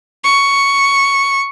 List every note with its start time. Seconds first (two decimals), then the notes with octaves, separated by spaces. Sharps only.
0.24 C#6